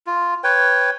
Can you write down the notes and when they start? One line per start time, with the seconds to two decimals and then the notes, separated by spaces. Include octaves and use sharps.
0.07 F4
0.44 B4 C#5 G5